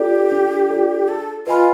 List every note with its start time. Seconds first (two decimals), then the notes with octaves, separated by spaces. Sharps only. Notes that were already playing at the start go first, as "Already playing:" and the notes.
Already playing: D4 F4 G4 A4 D5
0.32 D4
0.70 F4 A4 D5
1.08 G#4 A4
1.47 F4 B4 D#5 G#5 B5